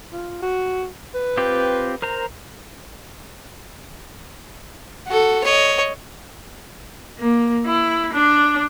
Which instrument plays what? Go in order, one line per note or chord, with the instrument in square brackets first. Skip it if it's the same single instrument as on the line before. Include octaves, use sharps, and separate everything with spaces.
[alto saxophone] F4
F#4
B4
[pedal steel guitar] C4 F4 G4
A#4 C5 A#5
[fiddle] F#4 A4
C#5 D#5
[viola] A#3
E4
D4